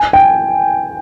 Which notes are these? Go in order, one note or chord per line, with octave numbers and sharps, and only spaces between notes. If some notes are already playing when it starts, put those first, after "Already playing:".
Already playing: G#5
G5